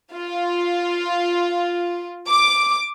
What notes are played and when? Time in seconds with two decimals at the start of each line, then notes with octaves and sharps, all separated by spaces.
0.14 F4
2.28 D6